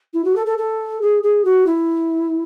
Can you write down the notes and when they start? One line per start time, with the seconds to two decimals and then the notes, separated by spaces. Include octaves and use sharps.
0.14 E4
0.24 F#4
0.36 A4
0.46 A4
0.58 A4
1.01 G#4
1.23 G#4
1.45 F#4
1.67 E4